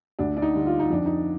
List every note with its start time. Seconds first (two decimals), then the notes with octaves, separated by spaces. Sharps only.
0.19 D2 D4
0.37 D4
0.42 D#4
0.55 D3 G3
0.66 F4
0.80 D#4
0.90 F2 D4
1.06 D#4